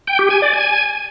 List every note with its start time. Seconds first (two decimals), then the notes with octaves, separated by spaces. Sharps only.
0.07 G5
0.19 G4
0.30 G#5
0.42 D5
0.53 G#5